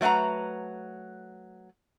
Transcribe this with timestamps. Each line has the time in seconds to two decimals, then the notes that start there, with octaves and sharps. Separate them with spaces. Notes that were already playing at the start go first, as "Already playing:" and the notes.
0.01 F#3 A3 B4 F#5 A#5